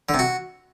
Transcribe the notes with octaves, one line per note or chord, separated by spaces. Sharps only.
D3
C3
F#4